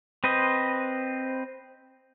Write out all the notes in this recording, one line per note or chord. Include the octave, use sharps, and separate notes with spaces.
C4 B4 C5 D#5